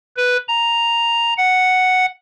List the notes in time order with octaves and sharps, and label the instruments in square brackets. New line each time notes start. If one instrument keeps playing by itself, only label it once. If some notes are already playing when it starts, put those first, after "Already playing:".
[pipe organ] B4
A#5
F#5